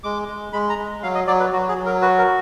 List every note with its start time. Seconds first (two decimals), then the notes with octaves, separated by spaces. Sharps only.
0.04 G#3 D6
0.28 G#3
0.53 G#3 B5
0.70 A#5
0.78 G#3
1.03 F#3 F5
1.15 D#5
1.27 F#3 D5
1.40 B4
1.52 F#3 F#4
1.69 G#4
1.77 F#3
1.86 A#4
2.02 F#4 B4
2.18 A#4